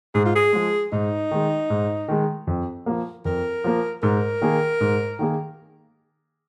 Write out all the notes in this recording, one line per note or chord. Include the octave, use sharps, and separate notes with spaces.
G#2 G#4
F4
G#4
F3 G#3
G#2 D#4
D#3 G#3
G#2
D#3 G#3
F2
F3 A#3
F2 A#4
F3 A#3
G#2 A#4
D#3 A#3 G#4
G#2
D#3 A#3 G#4